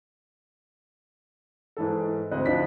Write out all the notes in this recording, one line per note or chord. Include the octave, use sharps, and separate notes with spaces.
G#2 E3 A4
D2 C4 D#5 F#6
D2 F3 D4 D#4 F4 B6